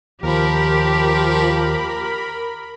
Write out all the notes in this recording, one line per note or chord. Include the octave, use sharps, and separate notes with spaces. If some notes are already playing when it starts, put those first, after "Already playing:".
D#2 F3 G4 A#4 B5